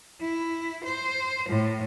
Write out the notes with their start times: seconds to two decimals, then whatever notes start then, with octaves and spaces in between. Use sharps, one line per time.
0.21 E4
0.84 C5
1.50 A2